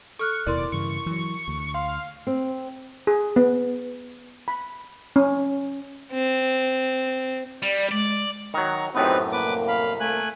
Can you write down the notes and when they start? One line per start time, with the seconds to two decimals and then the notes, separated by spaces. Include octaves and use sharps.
0.19 A4 C#6 F6 F#6
0.47 D1 D#2 B2 E4 A#4 D5 C6
0.72 G2 C#3 E3 C#6
1.06 E3 F#3
1.48 D2
1.74 F5 C6
2.27 C4
3.07 G#4
3.36 B3
4.48 B5
5.16 C#4
6.13 C4
7.62 G3 D5
7.91 G#3 D5
8.54 D#3 F#3 A#5 C#6
8.95 F#2 A2 B3 C4 D#4 G4 B4 C5
9.32 C2 A#3 B4 D6
9.68 F5 B5
10.00 A3 G#5 F#6